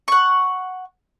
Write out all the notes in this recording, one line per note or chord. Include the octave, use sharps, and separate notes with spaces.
F#5 C#6